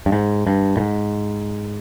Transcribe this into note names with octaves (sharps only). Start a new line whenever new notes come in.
G2
G#2
G2
A2
G#2